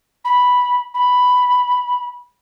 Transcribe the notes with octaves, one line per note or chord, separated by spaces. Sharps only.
B5
B5